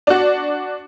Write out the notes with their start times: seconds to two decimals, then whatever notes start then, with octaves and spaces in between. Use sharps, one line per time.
0.07 D4 F#4